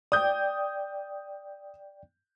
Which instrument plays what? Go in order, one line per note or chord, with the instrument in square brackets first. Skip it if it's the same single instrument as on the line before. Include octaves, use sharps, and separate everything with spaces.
[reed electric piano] D5 G5 [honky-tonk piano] D#6 G6